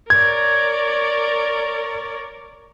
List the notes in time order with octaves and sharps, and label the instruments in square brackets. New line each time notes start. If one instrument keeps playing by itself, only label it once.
[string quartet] A#4 C#5 D5 [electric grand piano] G#6